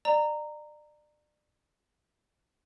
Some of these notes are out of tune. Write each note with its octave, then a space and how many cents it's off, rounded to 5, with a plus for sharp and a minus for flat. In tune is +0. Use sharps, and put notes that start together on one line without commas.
D5 +35 A#5 -10